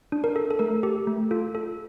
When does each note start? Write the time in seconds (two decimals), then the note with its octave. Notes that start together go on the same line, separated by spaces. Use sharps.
0.12 D4
0.24 A#4
0.36 A4
0.51 A4
0.59 A3 A#4
0.83 G4 A4
1.07 A3
1.31 F4 A4
1.55 A4